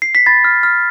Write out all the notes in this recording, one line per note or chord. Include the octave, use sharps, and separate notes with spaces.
C7
B6
B5 A6
F6
F6